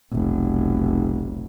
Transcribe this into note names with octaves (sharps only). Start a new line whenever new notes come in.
F1 B1